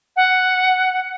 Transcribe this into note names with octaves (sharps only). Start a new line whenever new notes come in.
F#5